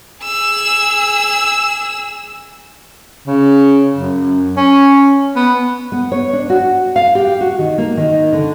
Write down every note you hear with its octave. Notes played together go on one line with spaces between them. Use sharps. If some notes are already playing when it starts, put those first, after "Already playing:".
G#4 E6
C#3
F#2
C#4
B3
B3
C#5
D4
F#4
F5
G4
F#4
D#3
A#3
D#3
D3